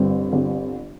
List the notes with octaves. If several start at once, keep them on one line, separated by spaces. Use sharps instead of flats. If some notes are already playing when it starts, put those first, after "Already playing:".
Already playing: G1 G2 G3 C4
G1 G3 C4